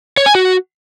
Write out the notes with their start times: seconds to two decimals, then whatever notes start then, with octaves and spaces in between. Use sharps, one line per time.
0.17 C#5
0.26 G#5
0.35 F#4